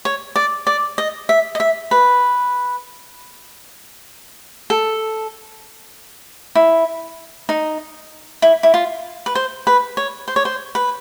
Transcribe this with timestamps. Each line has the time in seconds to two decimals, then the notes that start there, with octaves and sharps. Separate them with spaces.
0.05 C#5
0.36 D5
0.67 D5
0.98 D#5
1.29 E5
1.55 D#5
1.60 E5
1.91 B4
4.70 A4
6.55 E4
7.49 D#4
8.42 E4
8.63 E4
8.74 F4
9.26 B4
9.35 C5
9.67 B4
9.97 C#5
10.28 C5
10.36 C#5
10.45 C5
10.75 B4